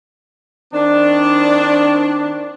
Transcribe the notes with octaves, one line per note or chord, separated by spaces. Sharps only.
D#3 C4 D4